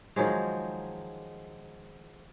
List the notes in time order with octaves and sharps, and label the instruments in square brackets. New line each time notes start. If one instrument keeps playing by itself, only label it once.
[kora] D#3 F3 F#3 G#3